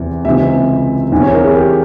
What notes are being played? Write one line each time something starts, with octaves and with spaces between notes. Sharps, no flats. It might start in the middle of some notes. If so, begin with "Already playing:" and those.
Already playing: E2 C3 E3
C#2 C3 E3 E5
E2 C3 E3
C#5
A#4
G#4
G4